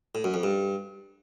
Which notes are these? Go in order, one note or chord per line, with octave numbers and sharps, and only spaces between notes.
A2
F#2
F2
G2